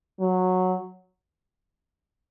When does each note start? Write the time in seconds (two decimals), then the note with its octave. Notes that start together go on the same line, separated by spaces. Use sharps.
0.20 F#3